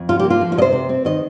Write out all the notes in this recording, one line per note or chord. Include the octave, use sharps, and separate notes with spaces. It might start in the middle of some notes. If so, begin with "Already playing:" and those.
Already playing: F2
C3 F4
A#3 G4
F4
F3
F4
C3 C5 D#5
C3
C4
D#3 D#5